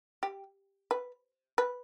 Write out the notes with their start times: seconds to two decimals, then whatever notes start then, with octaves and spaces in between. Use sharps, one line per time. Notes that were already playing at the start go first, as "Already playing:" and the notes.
0.23 G4
0.91 B4
1.58 B4